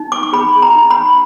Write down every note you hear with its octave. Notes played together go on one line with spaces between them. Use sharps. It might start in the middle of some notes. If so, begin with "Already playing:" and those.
Already playing: D#4
D6
D6
G#4 B5
A#5
D#4
B5